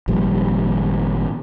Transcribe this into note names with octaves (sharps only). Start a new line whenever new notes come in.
G#1 A#2 F3 G3